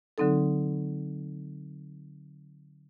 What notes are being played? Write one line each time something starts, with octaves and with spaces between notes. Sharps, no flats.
D3 F#3 C4 D#4 A4